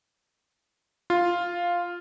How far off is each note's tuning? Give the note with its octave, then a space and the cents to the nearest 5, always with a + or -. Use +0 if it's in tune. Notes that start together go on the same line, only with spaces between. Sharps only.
F4 +0 F5 +5